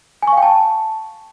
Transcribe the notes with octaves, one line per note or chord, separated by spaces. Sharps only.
G#5
C#6
F5
G5
A5